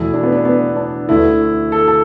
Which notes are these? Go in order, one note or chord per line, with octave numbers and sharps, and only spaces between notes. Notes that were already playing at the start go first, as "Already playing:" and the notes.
Already playing: E2 B2 A3 E4
D4
B3
D4
B3
D4
D2 D3 A3 E4
A4
A4